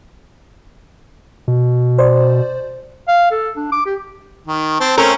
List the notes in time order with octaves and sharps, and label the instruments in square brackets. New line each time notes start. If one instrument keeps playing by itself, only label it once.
[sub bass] B2
[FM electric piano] C5 D5
[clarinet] F5
A4
D4
D6
G4
[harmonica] D#3
C4 A5
[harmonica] A3 C4 C#4 [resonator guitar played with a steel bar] A#4